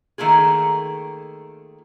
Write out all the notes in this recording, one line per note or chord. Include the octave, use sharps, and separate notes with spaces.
D#3 A3 A#3 F4 G#4